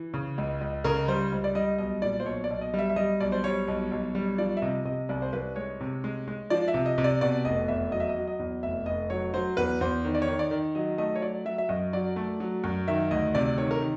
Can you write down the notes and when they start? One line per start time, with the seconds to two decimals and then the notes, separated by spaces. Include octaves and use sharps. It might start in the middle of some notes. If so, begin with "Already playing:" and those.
Already playing: E3
0.14 C#3
0.38 C#2
0.61 C#2
0.84 C#3 A#4
1.08 G3 C5
1.32 C#2
1.44 D5
1.55 G3 D#5
1.78 B1 D#5
2.02 A#2 D5
2.20 C5
2.26 B1 C#5
2.44 D5
2.50 B1
2.61 D#5
2.74 G3
2.79 E5
2.90 E5
2.96 G3 D#5
3.20 B1 D5
3.32 C5
3.44 G3 C#5
3.68 B1
3.91 B1
4.15 G3
4.38 F3 D5
4.57 E5
4.62 C3 D#5
4.85 C3 D#5
5.09 C2 D5
5.22 C5
5.33 C2 B4
5.56 G#3 C#5
5.80 C3
6.04 G#3
6.28 G#3
6.50 F3 D5
6.68 E5
6.74 C3
6.86 D#5
6.98 C3
7.04 D5
7.21 B2 D5
7.45 F1 D#5
7.68 E2 E5
7.92 F#3 D#5
8.00 E5
8.09 D#5
8.16 F#3
8.27 D#5
8.39 E2
8.63 F1 E5
8.86 F1 D#5
9.10 F#3 C#5
9.34 F#3 C5
9.57 E2 B4
9.81 E2 C5
10.05 D#3
10.15 D5
10.22 C#5
10.28 D#3
10.39 D5
10.51 D#3
10.75 F#3 D#5
10.98 A3 D#5
11.16 C#5
11.22 F#3 D5
11.45 F#3 E5
11.58 E5
11.69 F#2 D#5
11.93 F#3 D5
12.16 A3
12.40 F#3
12.64 F#2
12.88 D#3 E5
13.11 D2 D#5
13.35 C3 D5
13.58 D#3 C#5
13.71 A#4
13.81 D#3